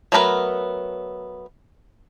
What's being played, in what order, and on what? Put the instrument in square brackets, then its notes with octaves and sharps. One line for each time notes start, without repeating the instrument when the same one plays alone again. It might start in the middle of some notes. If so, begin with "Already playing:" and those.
[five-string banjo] F#3 A3 B3 A#4 B4